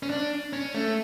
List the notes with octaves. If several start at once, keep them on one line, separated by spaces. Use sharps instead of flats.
C#4
D4
C#4
A3